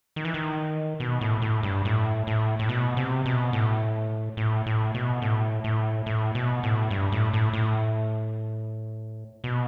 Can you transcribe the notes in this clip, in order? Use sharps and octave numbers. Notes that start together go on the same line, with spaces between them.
D#3
E3
D#3
B2
A2
A2
G2
A2
A2
A2
B2
C3
B2
A2
A2
A2
B2
A2
A2
A2
B2
A2
G2
A2
A2
A2
B2